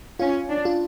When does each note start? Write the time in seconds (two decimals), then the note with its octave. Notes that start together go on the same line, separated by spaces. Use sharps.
0.19 C#4 F4
0.50 D4
0.65 F4